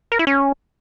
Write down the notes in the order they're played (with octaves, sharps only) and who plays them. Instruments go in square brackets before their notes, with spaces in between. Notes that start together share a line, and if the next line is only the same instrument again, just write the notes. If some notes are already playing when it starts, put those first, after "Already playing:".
[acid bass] A#4
E4
C#4